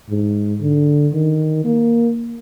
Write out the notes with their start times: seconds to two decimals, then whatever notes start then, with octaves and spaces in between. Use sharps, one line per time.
0.10 G#2
0.61 D3
1.13 D#3
1.64 A#3